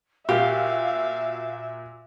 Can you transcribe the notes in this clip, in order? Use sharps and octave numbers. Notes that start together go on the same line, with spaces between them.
A#2 F#4 G4 E5 F5